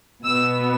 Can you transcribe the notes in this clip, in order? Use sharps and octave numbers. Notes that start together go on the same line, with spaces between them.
B2 B3 E6